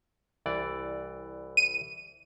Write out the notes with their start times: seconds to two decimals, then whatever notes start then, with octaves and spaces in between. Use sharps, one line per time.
0.46 C2 E3 D5
1.57 D#7